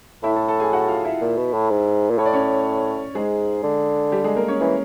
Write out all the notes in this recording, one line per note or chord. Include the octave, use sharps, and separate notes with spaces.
A2 E4 E5
A4 A5
A4 A5
G#4 G#5
F#4 F#5
F4 F5
E4 E5
A#2
B2
A2
G#2
A#2
A2 C#5
D5
C#4 C#5
G#2 G#3 G#4
D3
G3 G4
G#3 G#4
A#3 A#4
C#4 C#5
E3 C#4 C#5